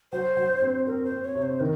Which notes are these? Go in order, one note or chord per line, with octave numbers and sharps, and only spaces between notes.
F#3 C5
F#3
C4
C4 A#4
C5
C4
C#5
C3
C5
D#3 A#4